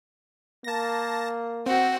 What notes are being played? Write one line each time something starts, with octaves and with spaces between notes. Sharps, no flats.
A#3 A5 A#6
C4 F#4